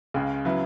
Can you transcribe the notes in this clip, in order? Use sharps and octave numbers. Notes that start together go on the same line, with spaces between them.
C#2 C#3 G#3
C#3 F#3 B3 E4